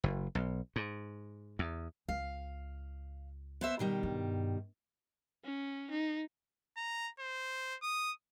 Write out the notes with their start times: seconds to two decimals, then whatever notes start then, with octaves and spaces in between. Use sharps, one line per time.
0.04 F#1
0.35 B1
0.76 G#2
1.59 E2
2.08 C#2 F5
3.61 B3 C5 E5
3.79 B2 D#3 G3
4.03 G2
5.44 C#4
5.91 D#4
6.77 A#5
7.20 C5
7.82 D#6